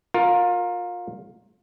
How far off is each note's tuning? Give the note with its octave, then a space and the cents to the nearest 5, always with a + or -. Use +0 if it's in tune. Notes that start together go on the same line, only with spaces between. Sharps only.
F4 +30 A#4 +0